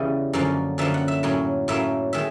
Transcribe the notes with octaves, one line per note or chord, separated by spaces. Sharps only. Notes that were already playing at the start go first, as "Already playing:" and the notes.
Already playing: E2 C#3 E3 G3 D#5
F#2 D3 F3 A#3 C#4
F#2 D3 F3 A#3 C#4 E5
F#5
E5
A2 F#3 A#3 C#4
A2 F#3 A#3 C#4 E5
D#3 G#3 E5